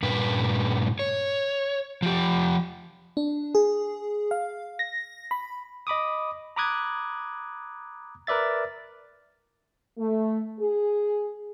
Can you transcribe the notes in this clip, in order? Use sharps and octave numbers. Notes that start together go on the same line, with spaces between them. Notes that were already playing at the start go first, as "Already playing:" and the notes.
G2 A#2 B4
C#5
F3 G4
D4
G#4
F5
A#6
B5
D#5 B5 D6 D#6
A#5 B5 D6 D#6 F#6 G#6
A#4 B4 D5 E5 A6
A3
G#4